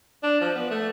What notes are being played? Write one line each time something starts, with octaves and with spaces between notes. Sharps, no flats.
D4
F3
B3
A3